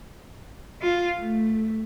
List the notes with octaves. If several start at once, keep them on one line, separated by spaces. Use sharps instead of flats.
F4
A3